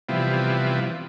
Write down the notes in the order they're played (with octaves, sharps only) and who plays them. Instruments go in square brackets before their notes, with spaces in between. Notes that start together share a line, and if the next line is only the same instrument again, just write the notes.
[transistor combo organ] C3 E3 F3 G3 B3